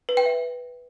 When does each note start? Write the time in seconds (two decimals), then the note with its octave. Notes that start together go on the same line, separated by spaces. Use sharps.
0.09 B4
0.17 G5
0.26 E5